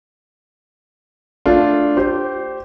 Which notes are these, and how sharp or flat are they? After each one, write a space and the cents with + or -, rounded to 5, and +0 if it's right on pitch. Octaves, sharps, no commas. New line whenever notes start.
A3 +0 D4 -5 F4 +0
G4 -20 C5 +0